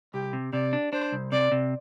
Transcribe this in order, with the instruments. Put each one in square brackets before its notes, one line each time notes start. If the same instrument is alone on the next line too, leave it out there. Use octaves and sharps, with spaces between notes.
[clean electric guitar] C2 [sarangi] G4
[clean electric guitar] C3
[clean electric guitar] C3 [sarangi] D5
[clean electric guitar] D4
[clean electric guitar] D4 [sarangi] C5
[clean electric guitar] C2
[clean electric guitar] C3 [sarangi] D5
[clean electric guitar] C3